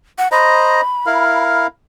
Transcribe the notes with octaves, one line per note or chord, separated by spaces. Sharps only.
F#5
C5 D#5 A#5 B5
E4 A#4 F5